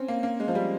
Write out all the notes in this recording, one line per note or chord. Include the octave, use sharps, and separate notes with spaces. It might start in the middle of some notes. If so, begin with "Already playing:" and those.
Already playing: C4 C#4
A#3
A#3
G#3
F3
G3